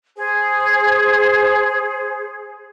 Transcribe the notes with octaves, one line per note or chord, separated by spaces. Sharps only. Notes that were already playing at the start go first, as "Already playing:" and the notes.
G#4 C5